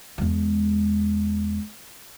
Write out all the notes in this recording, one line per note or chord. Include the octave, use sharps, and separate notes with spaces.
E2 G#3